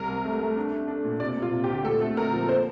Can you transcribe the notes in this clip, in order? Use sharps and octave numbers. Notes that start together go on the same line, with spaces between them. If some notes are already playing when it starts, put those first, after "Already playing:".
Already playing: C2 A#4
C3
A3
A3
D4
D4
D4
A#2
C3 D5
C3
F4
C3
G4
D2
A#2 A4
A3
A3 A#4
F3
A#3 C5